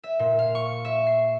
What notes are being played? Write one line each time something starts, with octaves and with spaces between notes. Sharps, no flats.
E5
A#2
F5
C#6
E5
C7